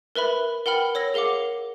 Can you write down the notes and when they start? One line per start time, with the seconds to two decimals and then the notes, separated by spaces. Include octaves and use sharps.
0.15 A#4 B4 E5 B5
0.66 A#4 F#5 G5 B5 F6
0.95 C#5 E6 A#6
1.14 G#4 A#4 F5 F#5 D6